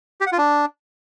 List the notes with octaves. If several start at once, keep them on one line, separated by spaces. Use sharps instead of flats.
G4
F#5
F4
D4